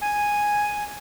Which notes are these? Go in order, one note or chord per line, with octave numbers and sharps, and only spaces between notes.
G#5